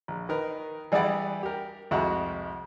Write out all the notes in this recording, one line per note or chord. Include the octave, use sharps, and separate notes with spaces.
A#1
D#3 A#4 B4
E3 G3 E4 G#4 D5 F#5
G4 A#4
C2 F2 G#3 E4 F#4 F#6